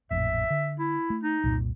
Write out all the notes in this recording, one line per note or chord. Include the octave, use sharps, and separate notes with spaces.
A1 F2 A#2 E5
D3
E4
A3
D#4
C2 F2 A#2